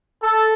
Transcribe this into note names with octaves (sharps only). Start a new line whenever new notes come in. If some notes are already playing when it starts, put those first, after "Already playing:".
A4